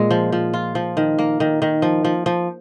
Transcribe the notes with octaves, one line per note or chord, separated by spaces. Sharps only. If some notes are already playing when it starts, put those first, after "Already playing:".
Already playing: A#2 G#3
F3
F3
F4
F3
D#3
A#3
D#3
D#3
F3
F3
F3